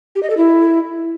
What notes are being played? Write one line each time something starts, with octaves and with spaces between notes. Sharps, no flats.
G4
D#5
A4
E4